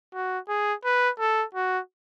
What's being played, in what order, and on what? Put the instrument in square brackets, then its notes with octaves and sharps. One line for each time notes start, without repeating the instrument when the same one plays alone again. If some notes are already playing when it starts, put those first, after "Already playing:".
[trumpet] F#4
G#4
B4
A4
F#4